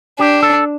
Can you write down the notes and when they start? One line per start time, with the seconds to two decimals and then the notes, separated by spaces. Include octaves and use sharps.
0.20 D4 G4
0.43 A4